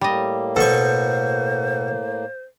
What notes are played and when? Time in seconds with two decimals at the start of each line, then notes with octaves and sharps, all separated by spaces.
0.01 A2 G3 A#3 D#5
0.56 B2 A4 C5 C#6